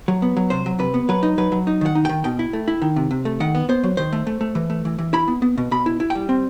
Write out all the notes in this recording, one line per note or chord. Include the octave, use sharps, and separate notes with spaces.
F#3
B3
F#3
C3 C5
F#3
C3 B4
B3
F#3 B4
D#4
F#3 B4
F#3
D#4
D#3 F#5
D#4
D#3 G5
B2 G5
E4
A3
E4
D#3
C3
C3
A3
D#3 F#5
B3
B3 C5
F#3
D#3 C5
A3
A3
A3
E3
A3
E3
E3
E4 B5
B3
B3
B2
B2 B5
E4
E4
G5
G3
C4